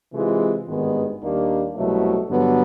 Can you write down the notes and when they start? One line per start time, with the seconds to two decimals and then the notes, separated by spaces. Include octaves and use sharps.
0.13 C3 E3 G#3 C4 F4
0.67 G#1 G2 D#3 G#3 B3
1.21 D#2 D#3 G3 A#3 D4
1.75 C2 B2 F#3 A3
2.29 G2 D3 F#3 B3